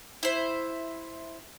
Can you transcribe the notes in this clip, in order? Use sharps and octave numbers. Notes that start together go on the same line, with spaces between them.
E4 C5